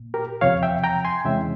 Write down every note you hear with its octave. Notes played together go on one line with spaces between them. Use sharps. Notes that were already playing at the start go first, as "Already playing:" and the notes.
Already playing: A#2
G4 A#4
E2 C3 F3 C#5 F5
E5 G5
G5 A#5
G#5 C6
E2 C3 E3 G#3 C#4 E5 G5